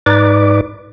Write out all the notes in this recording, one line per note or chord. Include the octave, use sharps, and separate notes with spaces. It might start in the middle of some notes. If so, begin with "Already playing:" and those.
G#2 D#4 B4 D5 D6